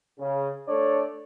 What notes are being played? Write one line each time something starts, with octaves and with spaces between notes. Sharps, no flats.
C#3
A3 D4 A4 C#5 D5